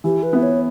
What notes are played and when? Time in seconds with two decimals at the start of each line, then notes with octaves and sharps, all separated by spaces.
0.04 E3 G4
0.23 B4
0.33 B3 E4
0.43 C#5